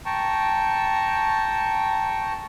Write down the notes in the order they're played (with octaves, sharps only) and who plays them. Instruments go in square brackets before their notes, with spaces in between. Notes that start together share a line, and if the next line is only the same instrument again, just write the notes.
[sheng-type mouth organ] G5 A5 A#5 C#6